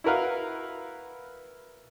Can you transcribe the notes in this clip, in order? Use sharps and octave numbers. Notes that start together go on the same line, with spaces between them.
E4 F#4 A#4 B4 F5